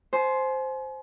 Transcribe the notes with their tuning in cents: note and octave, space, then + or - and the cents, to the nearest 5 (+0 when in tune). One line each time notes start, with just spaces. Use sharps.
C5 +0 G#5 +40